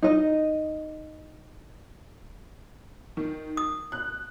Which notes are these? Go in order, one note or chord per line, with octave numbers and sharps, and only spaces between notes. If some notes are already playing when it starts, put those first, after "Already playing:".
D#4 D#5
D#3
D#6
F#6